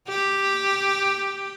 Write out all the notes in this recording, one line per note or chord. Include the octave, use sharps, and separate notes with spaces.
G4